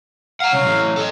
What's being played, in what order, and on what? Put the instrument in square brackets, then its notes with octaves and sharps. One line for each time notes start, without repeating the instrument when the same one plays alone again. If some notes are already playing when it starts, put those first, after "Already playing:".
[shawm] F5 [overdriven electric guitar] F#5 A#5
[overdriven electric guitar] C2 C#3 [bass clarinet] F#3
[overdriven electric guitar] A2 E3
A4 D#5